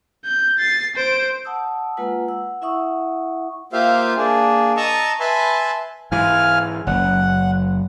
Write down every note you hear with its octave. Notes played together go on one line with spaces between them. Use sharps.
G6
A6 C7
C5 D7
F#5 A5 D#6 E6
G#3 A#3 F4 B4 F#5
F#5 E6
E4 E5 F#5 C#6 D#6
A#3 F4 G4 C5 E5 F5
A#3 D4 G#4
D#5 A5 A#5 C#6 D#6 E6
B4 E5 G#5 A5 B5 C6
G#2 E3 F5 G#5 F6
F#1 F#5